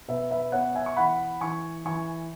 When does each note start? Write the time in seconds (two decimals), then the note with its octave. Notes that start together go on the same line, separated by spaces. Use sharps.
0.08 B2 B4 E5
0.31 B4 E5
0.52 B3 C#5 F#5
0.75 E5 G#5
0.86 C#6
0.97 E3 F#5 B5
1.41 E3 G#5 C#6
1.85 E3 G#5 C#6